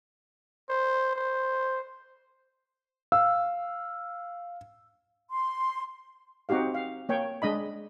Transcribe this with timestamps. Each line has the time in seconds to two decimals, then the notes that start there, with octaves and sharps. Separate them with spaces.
0.69 C5
1.16 C5
3.12 F5 E6
5.30 C6
6.49 C4 D#4 F#4 G4 F5
6.74 F5
7.09 A#3 C#5 G5
7.42 G#3 D4 D#5 B5